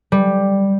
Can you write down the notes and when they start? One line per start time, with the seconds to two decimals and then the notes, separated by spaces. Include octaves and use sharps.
0.12 G3